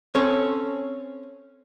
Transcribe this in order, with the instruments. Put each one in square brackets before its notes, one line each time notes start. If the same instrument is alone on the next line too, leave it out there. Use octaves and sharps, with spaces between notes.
[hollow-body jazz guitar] C4 C#4 A4 C#5